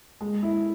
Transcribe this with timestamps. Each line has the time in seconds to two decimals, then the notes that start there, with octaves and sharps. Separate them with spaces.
0.21 G#3
0.43 E4